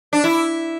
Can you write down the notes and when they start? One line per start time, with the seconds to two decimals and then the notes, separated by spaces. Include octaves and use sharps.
0.13 D4
0.24 E4